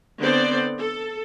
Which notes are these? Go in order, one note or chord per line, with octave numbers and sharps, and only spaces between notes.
D3 B3 C4 C5 D5
A4